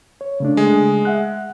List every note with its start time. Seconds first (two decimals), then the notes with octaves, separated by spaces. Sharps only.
0.21 C#5
0.40 C#3 A3 D4
0.57 G#3
1.05 E5 F#5 F#6